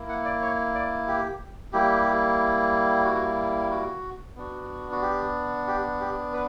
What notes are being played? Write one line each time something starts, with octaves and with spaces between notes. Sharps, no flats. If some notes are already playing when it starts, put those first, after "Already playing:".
Already playing: A#3 E4
F#5
D5
C#5
D5
G4
G3 A#3 E4 G4
F#4
F#4
B3 D4 F#4
F#4
G4
G4
G4
B4